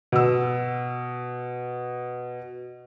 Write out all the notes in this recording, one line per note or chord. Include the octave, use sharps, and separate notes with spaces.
B2 E6